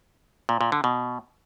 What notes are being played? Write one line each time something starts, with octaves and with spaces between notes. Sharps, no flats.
A#2
A#2
D3
B2